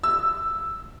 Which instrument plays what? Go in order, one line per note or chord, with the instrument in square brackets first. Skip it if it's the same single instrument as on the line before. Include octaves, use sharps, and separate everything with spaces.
[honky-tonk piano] E6